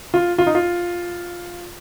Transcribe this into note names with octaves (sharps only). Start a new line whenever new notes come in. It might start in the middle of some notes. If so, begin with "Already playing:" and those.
F4
F4
D#4
F4